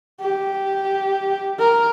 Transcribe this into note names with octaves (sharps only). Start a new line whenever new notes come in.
G4
A#4